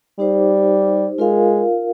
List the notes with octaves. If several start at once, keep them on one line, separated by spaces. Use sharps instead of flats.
G3 D#4 G4 C5
G#3 F4 A#4 F5